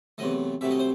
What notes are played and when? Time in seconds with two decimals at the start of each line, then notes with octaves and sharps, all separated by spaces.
0.18 E2 C3 F#3 A3 D#5
0.61 C2 C3 F#3 A3 E5
0.71 D#5
0.79 C5